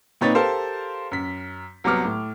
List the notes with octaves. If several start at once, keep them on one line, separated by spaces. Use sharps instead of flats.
A#2 C4 D#4 B4 C#5 A6
G4 A4 A#4 C5 F5 A5
F#2 B6
C2 F#3 B3 D6 F6
A2